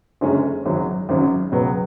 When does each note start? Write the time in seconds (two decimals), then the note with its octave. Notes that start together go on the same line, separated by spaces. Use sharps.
0.21 F#1 F#2 D3 G#3 C#4
0.65 G#1 F#2 C#3 F#3
1.09 G#1 F#2 C#3 F#3
1.52 C#2 B2 F#3 B3